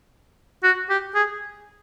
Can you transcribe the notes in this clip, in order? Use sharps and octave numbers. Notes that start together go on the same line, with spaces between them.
F#4
G4
G#4